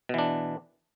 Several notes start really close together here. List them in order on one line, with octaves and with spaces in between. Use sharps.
B2 E3 D4